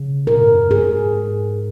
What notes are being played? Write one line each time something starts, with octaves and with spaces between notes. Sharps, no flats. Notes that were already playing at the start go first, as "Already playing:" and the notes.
Already playing: C#3
A#2 A#4
G#2
F#2
G#2 G#4